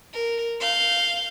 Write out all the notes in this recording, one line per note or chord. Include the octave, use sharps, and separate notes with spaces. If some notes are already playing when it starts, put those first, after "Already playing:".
A#4
F5 G6